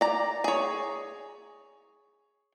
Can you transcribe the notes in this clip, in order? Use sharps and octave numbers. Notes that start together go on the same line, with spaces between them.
D5 A#5
G#4 C#5